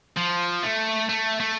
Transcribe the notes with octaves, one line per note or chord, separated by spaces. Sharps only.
F3
A3
A3
A3